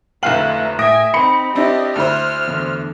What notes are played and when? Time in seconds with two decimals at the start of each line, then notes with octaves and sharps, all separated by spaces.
0.23 F1 D2 A3 E4 F5 A#5 F#7
0.79 A2 E5 G#5 D#6 A#6 D7
1.14 C4 D#4 B5 C#7
1.55 C4 D4 E4 G4 D#5
1.96 D2 E4 C5 F6
2.48 E2 D3